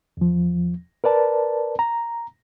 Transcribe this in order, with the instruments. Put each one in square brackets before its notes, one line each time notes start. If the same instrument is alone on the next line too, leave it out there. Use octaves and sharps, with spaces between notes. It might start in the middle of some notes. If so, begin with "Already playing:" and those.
[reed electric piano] E2 F3
A#4 B4 D5 A5
A#5